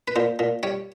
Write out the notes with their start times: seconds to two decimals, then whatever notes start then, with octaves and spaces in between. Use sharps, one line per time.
0.08 B4
0.16 A#2 C5
0.39 A#2
0.63 G3 C#5